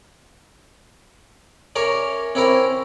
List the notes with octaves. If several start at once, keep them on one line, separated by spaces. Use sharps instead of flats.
C#4 A#4 C#5 E5 D6
C4 C#4 E4 A#4 C5